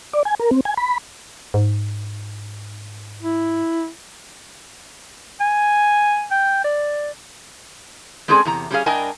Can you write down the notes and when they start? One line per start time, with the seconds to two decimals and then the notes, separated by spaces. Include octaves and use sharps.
0.13 D5
0.25 G#5
0.40 A#4
0.51 C4
0.65 G#5
0.77 B5
1.54 G#2
3.23 E4
5.40 G#5
6.31 G5
6.64 D5
8.28 G#3 C4 C#4 G#4 A4 D5
8.45 E2 C3 A#5
8.71 G3 B3 C#4 D4 G#4 F5
8.86 G2 D4 A#4 D#5 G5 G#5